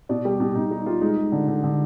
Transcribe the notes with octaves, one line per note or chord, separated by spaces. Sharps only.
B2 D5
G3 G4
B2
B2 D#4
G3 D#4
G3 F4
G#3 D#4
G#3
D3
D3
D3